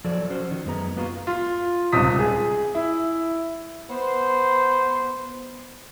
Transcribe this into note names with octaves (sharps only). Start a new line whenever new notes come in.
F3 F#3 A4 D5
C#4 F#4 C5
D#3
F#2 G#3 B3 A#5
A#3 B3 F4 F#4
F4
D#1 C#2 C3 D#6 B6
G#4
E4
B3 C5